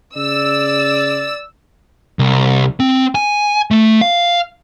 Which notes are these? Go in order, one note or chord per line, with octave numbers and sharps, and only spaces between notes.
C#3 D5 E6
C2
C4
G#5
A3
F5